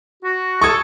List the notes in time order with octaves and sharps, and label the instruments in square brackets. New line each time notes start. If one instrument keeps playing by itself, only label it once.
[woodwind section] F#4
[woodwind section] A4 [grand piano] C#6 D#6 G#6